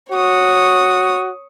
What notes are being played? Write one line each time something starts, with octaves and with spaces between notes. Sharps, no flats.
F#4 C#5 D#6